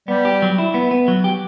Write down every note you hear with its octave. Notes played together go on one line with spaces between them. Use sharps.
G3 B3
G4
F#3
E4
B3
B3
F#3
G4